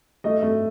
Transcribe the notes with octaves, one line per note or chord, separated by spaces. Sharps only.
A3 D#5
A3